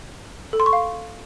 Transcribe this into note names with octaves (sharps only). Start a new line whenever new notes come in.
A4
C6
C#6
F5